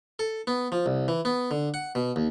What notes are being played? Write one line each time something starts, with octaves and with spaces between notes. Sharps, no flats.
A4
B3
F3
C2
E3
B3
D3
F#5
B2
D#2